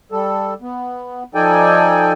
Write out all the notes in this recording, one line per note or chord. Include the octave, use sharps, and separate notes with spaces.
G3 A4
B3
F3 D#4 A4 D5 G5 G#5